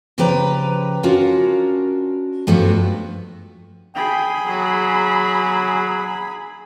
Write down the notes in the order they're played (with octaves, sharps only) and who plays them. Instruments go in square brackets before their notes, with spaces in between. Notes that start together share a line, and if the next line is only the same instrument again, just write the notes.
[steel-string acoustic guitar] C#3 F3 G4 B4 G5 A#5
C#4 D4 F4 F#4 A#4
G2 F3 A3 B3 D4 F#4
[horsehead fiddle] G#4 B5 [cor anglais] G5
[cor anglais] F#3